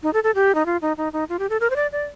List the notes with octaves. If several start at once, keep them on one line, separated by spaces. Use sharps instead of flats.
D#4
A4
A4
G4
D#4
F4
D#4
D#4
D#4
F4
G4
A4
A#4
C5
D5
D5